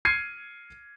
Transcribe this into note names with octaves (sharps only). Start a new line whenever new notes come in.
F6 G#6 C7 C#7 D#7